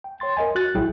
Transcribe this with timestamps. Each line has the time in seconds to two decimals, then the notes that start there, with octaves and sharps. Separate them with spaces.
0.04 G5
0.20 C#5 G5 C6 A6
0.37 A#4 D#5 G#5
0.55 F#4 F#6 A6
0.75 A#1 F#3 E4 G#4 G5